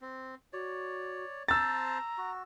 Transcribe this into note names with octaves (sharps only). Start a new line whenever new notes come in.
C4
F#4 C#5 D5
C4 C5 A5 A#5 E6 A6
F#4